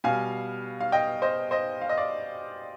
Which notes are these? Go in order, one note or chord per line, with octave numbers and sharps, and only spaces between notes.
B2 G3 F5 G#5
F5
D#5 G5
C5 D#5
C5 D#5
F5
D#5
D5 F5